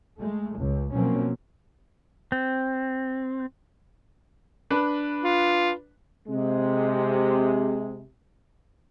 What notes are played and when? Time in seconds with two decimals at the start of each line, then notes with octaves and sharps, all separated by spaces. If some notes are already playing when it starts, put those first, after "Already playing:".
0.20 G#3 A3
0.58 C#2
0.93 B2 F3 F#3 A#3 C4 C#4
2.32 C4
4.71 D4 B4
5.24 F4
6.28 C3 G#3